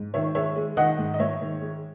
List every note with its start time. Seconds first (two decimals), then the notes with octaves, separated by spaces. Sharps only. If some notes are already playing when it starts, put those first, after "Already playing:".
Already playing: G#2
0.14 D#3 C#5 E5
0.35 G#3 C#5 E5
0.56 G#3
0.77 D#3 D#5 F#5
0.98 G#2
1.14 D#5
1.19 G#2 C#5 E5
1.41 D#3
1.61 G#3